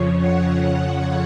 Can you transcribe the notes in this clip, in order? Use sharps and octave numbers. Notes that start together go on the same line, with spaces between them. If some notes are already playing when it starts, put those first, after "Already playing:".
Already playing: F2 C#3 F3 C#5
F#5